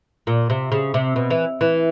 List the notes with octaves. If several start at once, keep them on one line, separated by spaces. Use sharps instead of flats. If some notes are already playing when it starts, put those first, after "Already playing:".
A#2
C3
C#3
C3
B2
E3
E3